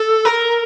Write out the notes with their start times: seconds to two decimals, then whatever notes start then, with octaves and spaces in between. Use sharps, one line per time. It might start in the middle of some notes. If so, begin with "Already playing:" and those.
Already playing: A4
0.25 A#4